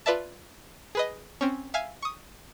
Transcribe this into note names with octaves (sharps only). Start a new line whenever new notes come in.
F4 B4 D5 E5 A5
G#4 B4 D#5
C4 C#4
E5 F5 G#5
C#6 D#6